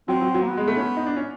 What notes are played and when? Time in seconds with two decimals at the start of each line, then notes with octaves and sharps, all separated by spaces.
0.08 F#3 C4
0.21 F#3
0.34 F#3
0.42 A#3
0.48 B3
0.57 G#3
0.68 A3
0.77 C#4
0.97 D#4
1.06 D4
1.16 C#4